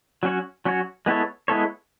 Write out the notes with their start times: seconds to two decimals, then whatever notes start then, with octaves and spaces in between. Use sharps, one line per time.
0.23 F#3 C#4 F#4 C#5
0.65 F#3 C#4 F#4 C#5
1.06 G#3 B3 E4 A4 C#5
1.48 G#3 B3 E4 A4 C#5